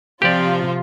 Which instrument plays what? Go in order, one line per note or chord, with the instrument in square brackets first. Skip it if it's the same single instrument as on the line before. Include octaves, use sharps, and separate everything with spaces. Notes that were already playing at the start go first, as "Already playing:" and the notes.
[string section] C3 F4 [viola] F3 [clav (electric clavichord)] G4 D5